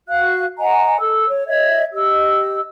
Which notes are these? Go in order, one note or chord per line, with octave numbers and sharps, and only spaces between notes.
F#4 F5 F#6
D#5 F#5 G#5 A#5
A4 E6
C#5
C#5 D#5 E5 G#6
G4 D#5 E6